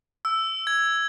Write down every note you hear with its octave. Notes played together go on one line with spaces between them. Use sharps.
E6
G#6